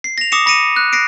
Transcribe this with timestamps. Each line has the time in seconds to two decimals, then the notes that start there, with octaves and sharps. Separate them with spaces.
0.04 C7
0.18 A#6 F7
0.32 D6 D#6 A#6 C#7 E7
0.46 B5 A#6 C#7 D#7 E7
0.76 F#6
0.93 A#6 C7 D7